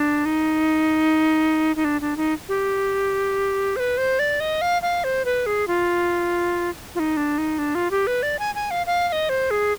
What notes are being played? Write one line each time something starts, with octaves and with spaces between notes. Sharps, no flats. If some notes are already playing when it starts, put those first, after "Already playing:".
Already playing: D4
D#4
D#4
D4
D4
D#4
G4
C5
B4
C5
D5
D#5
F5
F5
C5
B4
G#4
F4
F4
D#4
D4
D#4
D4
F4
G4
B4
D5
G#5
G#5
F5
F5
F5
D#5
C5
G#4